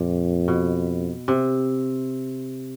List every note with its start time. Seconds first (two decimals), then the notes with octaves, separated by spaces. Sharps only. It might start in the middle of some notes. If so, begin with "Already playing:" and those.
Already playing: F2 A#2
0.48 B2
1.28 C3